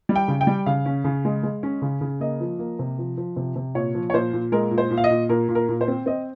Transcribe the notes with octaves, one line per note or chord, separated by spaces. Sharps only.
G3
G5
C#3
G5
G3
C#3 F5
C#4
C#3
G#3
G#3
C#4
C#3
C#3
A#3 D#5
F3
A#3
C3
F3
F3
C3
C3
A#2 C#5
F3
C#5
A#2 C5
A#2
G#3 A#4
A#2
C5
A#2
F5
D#5
A#2
A#2 A#4
A#2
A#4
A#2
C5
C4
C4 D#5